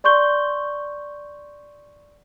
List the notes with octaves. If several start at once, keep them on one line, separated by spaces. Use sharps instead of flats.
D5 C6 C#6 G6 G7